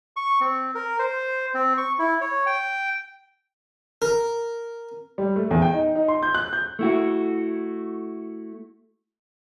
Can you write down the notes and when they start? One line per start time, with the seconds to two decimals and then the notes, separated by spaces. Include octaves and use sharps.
0.16 C#6
0.41 C4
0.75 A#4
0.99 C5
1.54 C4
1.77 C#6
1.99 E4
2.21 C#5
2.46 G5
4.02 A#4
5.18 G3
5.36 A3
5.51 E2
5.62 G5
5.74 D#4
5.95 D#4
6.08 C6
6.22 G6
6.34 F#6
6.53 G6
6.79 A3 E4 F#4